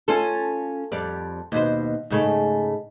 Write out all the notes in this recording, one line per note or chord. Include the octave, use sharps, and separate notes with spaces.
C#4 F4 A4
F2 G3 D5
D#2 B2 C5
G#2 C#3 A3